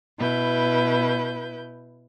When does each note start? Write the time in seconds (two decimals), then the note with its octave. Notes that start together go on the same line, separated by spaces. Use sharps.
0.18 B2 E4 B4 G6